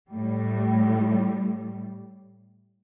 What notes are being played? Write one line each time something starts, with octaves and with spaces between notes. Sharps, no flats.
A2 G3